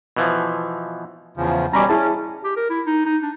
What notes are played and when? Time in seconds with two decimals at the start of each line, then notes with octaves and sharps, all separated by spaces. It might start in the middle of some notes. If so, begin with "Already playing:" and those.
0.17 B2 E3 F3
1.37 E2 C#3 F3
1.73 B2 G3 C#4 A#5 B5 D6
1.89 C#4 E4 G#4 A5
2.44 G4
2.56 A#4
2.70 E4
2.86 D#4
3.06 D#4
3.22 D4